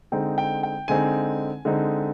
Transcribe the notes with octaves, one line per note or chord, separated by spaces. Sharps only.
D3 G#3 C4 D#4 G5
G5
G5
D3 G#3 C4 D#4 G#5
D3 G#3 C4 D#4